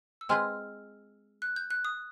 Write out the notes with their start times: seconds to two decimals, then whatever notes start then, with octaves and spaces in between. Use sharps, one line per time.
0.21 E6
0.29 G#3 C4 F4 G#4 B4 F6
1.42 F#6
1.56 G6
1.70 F#6
1.85 D#6